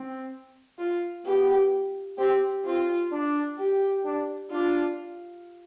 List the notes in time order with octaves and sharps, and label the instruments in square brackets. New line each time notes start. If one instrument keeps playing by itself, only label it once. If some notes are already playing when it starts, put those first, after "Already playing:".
Already playing: [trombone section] C4
[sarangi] F4
[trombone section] B3 [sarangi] G4
[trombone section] C4 [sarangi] G4
[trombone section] C4 [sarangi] F4
[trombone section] D4
[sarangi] G4
[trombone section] D4
[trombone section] D4 [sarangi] F4